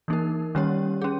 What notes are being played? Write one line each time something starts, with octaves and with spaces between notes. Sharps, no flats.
E3 A#3 D#4 A#4
D#3 G3 C#4 G4 C#5
C#4 G#4